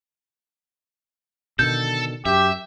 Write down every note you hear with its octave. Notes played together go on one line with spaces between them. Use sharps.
B2 D3 D#3 A4 G6
F#2 G4 E5